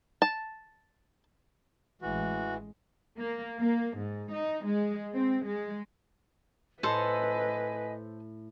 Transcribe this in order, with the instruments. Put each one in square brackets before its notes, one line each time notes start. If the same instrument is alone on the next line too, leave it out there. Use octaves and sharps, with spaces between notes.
[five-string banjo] A5
[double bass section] A1 G#3 [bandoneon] E3 [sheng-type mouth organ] F#4
[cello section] A#3
A#3
G#2
D#4
G#3
C4
G#3
[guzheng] A2 [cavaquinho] A4 C5 [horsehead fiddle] B4 [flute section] D#5 G#5